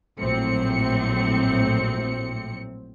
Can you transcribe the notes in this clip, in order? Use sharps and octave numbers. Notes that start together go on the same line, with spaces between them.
A#1 A2 F#3 C4 C#7